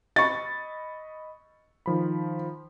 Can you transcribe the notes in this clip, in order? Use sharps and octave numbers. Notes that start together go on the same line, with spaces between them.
D#5 B5 C#6 A6
D#3 F3 B5